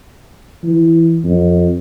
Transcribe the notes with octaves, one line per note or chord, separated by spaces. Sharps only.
E3
F2